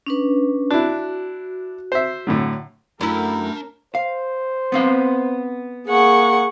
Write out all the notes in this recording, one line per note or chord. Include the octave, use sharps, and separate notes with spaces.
C#4 D4 B4
D4 E4 F#4
C5 E5
A2 D3 F#3
F#2 A3 D4 E4 A#4 B5
C5 F5
B3 C4 F5
A#3 G#4 F#5 C#6